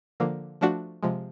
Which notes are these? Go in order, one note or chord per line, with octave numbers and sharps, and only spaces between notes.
D3 F3 A#3
F3 A3 D4 F#4
C3 F3 G#3